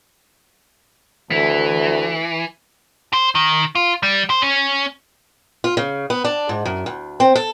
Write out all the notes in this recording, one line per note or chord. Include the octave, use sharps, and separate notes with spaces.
D2 E3
C5
D#3
F4
G3
C5
C#4
F4
C#3
B3
D4
G#2
F#2
D2
C4
A4